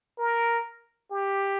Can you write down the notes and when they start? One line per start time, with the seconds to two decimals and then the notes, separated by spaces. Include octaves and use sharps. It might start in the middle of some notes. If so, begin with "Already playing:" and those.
0.18 A#4
1.12 G4